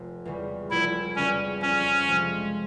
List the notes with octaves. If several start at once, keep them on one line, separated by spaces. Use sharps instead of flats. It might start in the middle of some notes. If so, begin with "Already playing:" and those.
Already playing: F1
E2 C#3 G3
F1 E4
E2 C#3 G3 C#4
F2 C#4
C3 F3 G#3